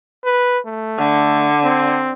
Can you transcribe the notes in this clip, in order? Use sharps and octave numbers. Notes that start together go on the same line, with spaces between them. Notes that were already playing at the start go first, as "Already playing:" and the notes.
B4
A3
D3
C4